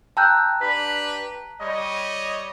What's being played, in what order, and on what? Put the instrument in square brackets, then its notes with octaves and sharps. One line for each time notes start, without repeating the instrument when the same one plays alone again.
[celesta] G5 E6 G6 [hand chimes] A5 A#5 F#6
[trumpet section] D4 G4 B4 [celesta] B6
[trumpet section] G3 C#5 D#5